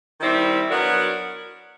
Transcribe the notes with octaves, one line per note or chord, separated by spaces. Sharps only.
D#3 G3 C4 E4
F#3 B3 D4 F#4 A#4